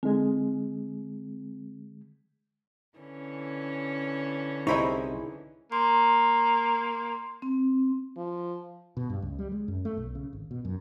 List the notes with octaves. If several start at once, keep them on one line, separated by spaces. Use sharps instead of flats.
D3 G#3 C4
D3 E3 C#4
C2 D#4 E4 G#4 C5 D#5 B5 C#6
A#3 C6
C4
F3
B2
G2
C#2
G3
G#3
F#2
A3
B1
C#3
G#1
B2
F#2